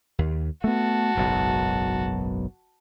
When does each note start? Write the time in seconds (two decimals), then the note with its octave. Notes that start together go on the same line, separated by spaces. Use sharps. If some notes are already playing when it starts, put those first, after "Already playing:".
0.19 D#2
0.64 A3 B3 F#4 A5
1.15 F#1 B1 G#2